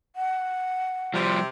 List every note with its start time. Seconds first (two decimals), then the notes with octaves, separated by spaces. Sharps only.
0.16 F#5
1.14 C3 F3 G3